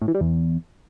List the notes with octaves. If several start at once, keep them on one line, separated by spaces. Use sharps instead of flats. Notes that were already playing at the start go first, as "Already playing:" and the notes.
A2
E3
G3
E2